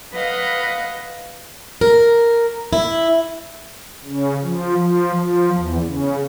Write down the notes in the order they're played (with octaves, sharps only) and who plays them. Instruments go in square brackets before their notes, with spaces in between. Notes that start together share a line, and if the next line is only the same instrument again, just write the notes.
[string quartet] B4 D#5 F5 F#5
[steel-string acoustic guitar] A#4
E4
[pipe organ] C#3
F3
F3
F3
E2
C#3